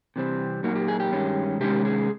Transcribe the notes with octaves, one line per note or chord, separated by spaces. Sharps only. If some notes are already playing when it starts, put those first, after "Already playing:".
C3 E3 G3 C4
A#2 F#3 A#3 D#4 F#4
G4
G#4
G4
G2 D#3 G#3 C#4
C3 D#3 G#3 C#4 G4
G#4